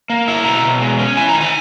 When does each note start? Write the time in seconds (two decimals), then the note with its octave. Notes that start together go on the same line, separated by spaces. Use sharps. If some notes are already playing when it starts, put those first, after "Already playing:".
0.10 A#3
0.28 E4
0.45 B2 A#5
0.63 B2
0.81 G#3
0.99 C#4
1.17 E4 G#5
1.29 A#5
1.34 D#3
1.41 G#5